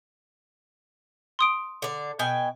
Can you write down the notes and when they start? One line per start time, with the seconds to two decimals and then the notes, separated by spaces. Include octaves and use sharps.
1.39 C6 D#6 D7
1.82 D3 D5
2.19 B2 G5 G#5